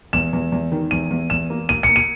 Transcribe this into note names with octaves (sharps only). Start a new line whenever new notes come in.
E2 E7
E2
E2
D#3
E2 D#7
E2
E2 E7
A#3
A#3 D#7
C#7
A#3
D#7